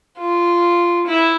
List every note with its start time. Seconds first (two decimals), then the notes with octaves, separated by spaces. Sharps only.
0.18 F4
1.06 E4